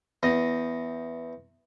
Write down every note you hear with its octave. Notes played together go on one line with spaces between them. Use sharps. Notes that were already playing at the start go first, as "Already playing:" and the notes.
E2 D#5